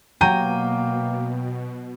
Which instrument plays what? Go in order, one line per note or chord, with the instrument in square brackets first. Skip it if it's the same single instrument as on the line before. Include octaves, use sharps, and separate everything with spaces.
[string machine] B2 [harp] F#3 A#5 [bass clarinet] A#3 [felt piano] G5 G6 D#7